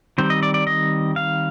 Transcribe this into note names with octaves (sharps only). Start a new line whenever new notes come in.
D#3 G3 C4 C5
D#5
D5
D5
D#5
F5